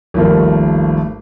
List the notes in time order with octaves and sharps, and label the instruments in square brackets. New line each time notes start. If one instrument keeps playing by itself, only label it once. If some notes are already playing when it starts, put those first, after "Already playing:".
[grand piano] G#1 D#2 F3 G3 A3 A#4